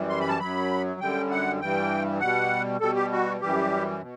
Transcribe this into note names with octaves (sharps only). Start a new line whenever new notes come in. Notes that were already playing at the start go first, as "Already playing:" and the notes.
Already playing: F#2 E3 G3
C6
B5
A5
F#2 F#3 B5
F#2 D3 G3 G5
F#5
G2 E3 G3 G5
B2 G3 F#5
B2 G3 A4
G4
F#4
F#2 E3 G3 G4
B2